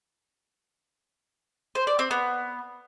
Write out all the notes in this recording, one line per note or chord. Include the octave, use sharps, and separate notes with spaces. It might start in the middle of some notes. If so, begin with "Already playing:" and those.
C5
D5
C4
B3